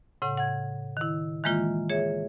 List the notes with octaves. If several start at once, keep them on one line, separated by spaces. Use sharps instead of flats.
A2 C#3 F#5
F#5 G#6
D#3 E4
D#3 E3 G#3 A#3 F4
G#4 C#5 E5